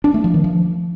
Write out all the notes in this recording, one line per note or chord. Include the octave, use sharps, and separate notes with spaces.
D4
A3
F3
D#3
F3